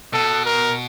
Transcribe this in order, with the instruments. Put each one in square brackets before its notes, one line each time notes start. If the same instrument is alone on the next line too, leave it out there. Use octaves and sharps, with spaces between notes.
[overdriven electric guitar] B2 [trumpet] A4
[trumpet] A#4